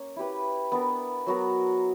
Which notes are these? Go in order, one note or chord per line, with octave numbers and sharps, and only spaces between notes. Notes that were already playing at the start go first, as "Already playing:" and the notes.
Already playing: A#3 C#4 C#5
E4 G4 B4
B3 D4 A#4
F#3 B3 F#4 A#4